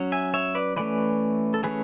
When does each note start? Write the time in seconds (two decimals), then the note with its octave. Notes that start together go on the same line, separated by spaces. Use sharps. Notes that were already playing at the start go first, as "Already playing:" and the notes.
Already playing: F#3 C#4
0.12 E5 G#5
0.34 C#5 E5
0.55 B4 D5
0.76 E3 A3 C#4 B4 D5
1.54 A4
1.63 E3 A3 C#4 G#4 B4